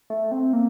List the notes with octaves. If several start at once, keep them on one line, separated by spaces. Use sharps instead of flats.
A3
C4
A#3